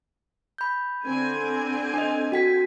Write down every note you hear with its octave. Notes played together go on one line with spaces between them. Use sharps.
B5 G6
D3 C4 G#5
D4 D#5
F#4 G5 B6